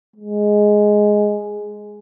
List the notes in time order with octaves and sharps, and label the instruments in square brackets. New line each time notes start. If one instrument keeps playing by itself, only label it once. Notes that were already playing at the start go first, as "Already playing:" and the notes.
[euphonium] G#3